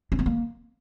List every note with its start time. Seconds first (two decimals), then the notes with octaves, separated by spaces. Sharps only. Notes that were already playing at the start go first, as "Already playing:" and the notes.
0.12 C#4
0.19 B3
0.26 A#3